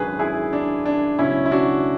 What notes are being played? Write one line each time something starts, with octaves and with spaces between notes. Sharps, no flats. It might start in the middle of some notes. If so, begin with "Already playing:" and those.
Already playing: G#1 F#2 D3 F#3 G#4 B4
E4 G#4
D4
D4
C#2 B2 F#3 C#4 E4
E4
D4 F#4